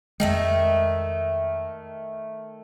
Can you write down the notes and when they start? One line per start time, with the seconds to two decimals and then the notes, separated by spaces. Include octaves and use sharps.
0.20 F2 D#3 G#3 A3 E5